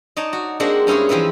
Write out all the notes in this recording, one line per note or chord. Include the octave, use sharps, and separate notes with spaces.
D#4 C#5 D5 A5
F#4
G#3 A#3 C4 D4 F#4 F#5
G2 C#4 E4 G#4 C#5
E3 F3 C4 E4 B4